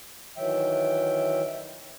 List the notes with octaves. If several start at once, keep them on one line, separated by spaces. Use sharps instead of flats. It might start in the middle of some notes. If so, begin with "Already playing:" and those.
D#3 E3 F#3 E5 G5